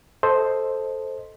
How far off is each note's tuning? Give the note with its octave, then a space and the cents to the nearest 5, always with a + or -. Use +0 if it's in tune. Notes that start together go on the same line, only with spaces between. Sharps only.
A4 +0 C5 +0 D#5 +0